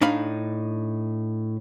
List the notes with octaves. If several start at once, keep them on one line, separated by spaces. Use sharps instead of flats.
A2 D4 D#4 F5 B5